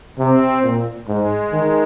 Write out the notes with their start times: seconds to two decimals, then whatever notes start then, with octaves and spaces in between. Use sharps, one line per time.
0.19 C3 C4
0.63 A#2
1.08 G#2 G#3
1.53 D#3